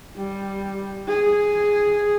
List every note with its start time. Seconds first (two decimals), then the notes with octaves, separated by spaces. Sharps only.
0.16 G3
1.08 G#4